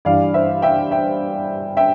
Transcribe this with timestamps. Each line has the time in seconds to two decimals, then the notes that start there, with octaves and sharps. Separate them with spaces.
0.05 G2 E3 D5 F5
0.34 C5 E5
0.62 E5 G5
0.91 E5 G5
1.77 E5 G5